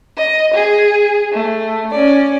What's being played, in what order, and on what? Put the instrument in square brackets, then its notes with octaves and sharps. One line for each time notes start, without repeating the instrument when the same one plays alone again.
[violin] D#5
G#4
A3
C#4 D5